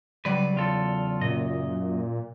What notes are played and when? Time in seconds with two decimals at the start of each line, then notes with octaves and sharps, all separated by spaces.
0.25 C#3 F#3 G3 B4 D5
0.55 E2 F4 A4
1.21 F#2 A#2 D#5